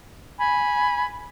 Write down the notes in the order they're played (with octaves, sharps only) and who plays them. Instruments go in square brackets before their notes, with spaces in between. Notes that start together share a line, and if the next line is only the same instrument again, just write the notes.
[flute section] G#5 B5